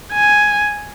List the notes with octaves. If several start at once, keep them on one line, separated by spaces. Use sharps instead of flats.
G#5